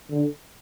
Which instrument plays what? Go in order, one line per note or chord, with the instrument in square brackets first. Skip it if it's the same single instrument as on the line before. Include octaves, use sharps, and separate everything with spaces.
[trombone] D3